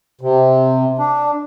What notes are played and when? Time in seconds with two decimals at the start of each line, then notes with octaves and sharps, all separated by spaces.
0.21 C3
0.99 D4